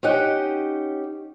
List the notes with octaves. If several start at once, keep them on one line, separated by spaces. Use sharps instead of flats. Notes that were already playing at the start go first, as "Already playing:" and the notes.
C#4 D#4 G4 F#5